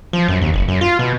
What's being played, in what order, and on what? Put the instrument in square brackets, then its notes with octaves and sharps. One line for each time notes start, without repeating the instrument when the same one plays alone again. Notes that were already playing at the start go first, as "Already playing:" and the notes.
[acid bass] F3
F#2
D#2
F#1
F#2
F4
B2